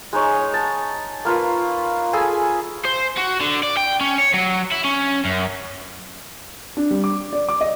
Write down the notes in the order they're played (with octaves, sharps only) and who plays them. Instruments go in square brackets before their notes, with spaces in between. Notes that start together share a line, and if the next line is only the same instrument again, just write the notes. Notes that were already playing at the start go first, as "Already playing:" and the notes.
[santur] G#3 D#4 C#5
A5
A#3 F4 B4 A#5
G#4 A4 G#5 B5
[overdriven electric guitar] C5
F#4
D3
D5
G5
C#4
C#5
F#3
E4
C#4
F#2
[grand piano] D4
G3
D6
D5
D6
D#5